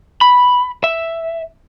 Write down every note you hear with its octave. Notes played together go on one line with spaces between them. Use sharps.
B5
E5